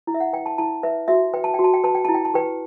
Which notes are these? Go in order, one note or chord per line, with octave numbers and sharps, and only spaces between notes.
E4
E5
F#5
B4 G5
A5
E4 A5
B4 E5
F#4 E5
B4 G5
A5
F#4 G5
A5
G5
B4 A5
G5
E4 A5
G5
A5
G4 B4 G5